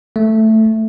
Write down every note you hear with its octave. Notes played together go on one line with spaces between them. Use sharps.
A3